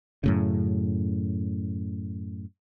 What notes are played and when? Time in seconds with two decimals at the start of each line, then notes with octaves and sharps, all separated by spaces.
0.24 F#2 A2 C#3